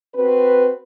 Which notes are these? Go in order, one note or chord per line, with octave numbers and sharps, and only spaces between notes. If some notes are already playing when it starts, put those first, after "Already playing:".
C4 F#4 B4